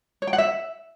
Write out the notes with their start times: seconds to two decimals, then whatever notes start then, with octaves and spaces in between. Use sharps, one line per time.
0.22 C#5
0.27 G5
0.33 F#5
0.38 E5